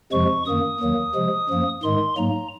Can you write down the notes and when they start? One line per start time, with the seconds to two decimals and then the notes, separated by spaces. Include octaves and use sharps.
0.12 F2 C3 F3 G#3 C#6
0.46 F#2 D#3 A#3 D#6
0.80 D#2 D#3 F#3 A#3
1.15 C3 F3 G#3
1.49 F#2 F3 A#3
1.83 G#2 D#3 G#3 C6
2.17 G#2 F#3 A#3 A#5